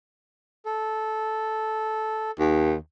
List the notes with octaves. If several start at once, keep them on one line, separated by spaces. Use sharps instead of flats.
A4
D#2